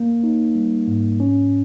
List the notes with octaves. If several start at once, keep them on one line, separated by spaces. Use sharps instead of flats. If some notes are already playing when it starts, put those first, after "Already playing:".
Already playing: A#3
D#4
G3
G#2
C#4